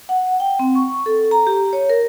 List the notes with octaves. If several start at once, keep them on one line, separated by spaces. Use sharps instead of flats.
F#5
G5
C4
C#6
A4
A#5
G4
C#5
A#4